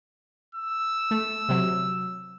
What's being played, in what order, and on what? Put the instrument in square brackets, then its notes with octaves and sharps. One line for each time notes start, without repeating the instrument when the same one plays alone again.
[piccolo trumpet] E6
[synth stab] A3
C3 F#3